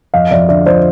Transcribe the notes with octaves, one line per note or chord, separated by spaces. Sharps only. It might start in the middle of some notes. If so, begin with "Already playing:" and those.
F2 D#5 F5
F2 D5 E5
D3 D5 E5
F3 C5 D5